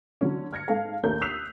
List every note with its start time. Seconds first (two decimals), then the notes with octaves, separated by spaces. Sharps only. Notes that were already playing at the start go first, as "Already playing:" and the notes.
0.21 D3 F#3 C#4
0.53 F6 G#6 A#6 C#7
0.68 G#2 A4 F5
1.03 A#1 D#2 A3 A#4 C#5 G6
1.21 D#6 E6 F#6 B6 C7 F7